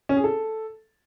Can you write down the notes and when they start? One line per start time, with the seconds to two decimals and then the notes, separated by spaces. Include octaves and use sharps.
0.09 C#4
0.17 G#4
0.24 A4